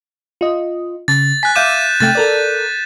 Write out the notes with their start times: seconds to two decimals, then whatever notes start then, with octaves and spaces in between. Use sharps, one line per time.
0.41 F4 D#5
1.08 C#3 A6
1.43 G#5 F#6 B6
1.56 E5 F5 D6 G6 D#7 E7
2.00 C3 A3 G5 A6
2.15 A4 A#4 D5